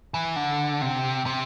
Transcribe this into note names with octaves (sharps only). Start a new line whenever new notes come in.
E3
D3
C3
C3